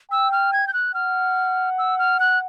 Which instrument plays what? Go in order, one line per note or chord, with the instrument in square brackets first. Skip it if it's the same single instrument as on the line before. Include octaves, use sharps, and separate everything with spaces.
[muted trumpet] G5 [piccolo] E6
[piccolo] F6
G#6
G6
F#6
[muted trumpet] F#5 [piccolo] F6
[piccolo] E6
F6
F#6